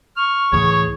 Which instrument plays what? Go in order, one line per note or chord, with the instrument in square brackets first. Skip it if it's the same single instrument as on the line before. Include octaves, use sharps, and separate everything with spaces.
[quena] C#6 [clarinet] F6
[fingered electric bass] C#2 A2 E3 [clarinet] G#4 [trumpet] C#5